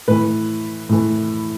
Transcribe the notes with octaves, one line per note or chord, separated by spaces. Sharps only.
A2 E3 B4
A2 E3